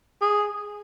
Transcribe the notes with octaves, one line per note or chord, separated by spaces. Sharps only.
G#4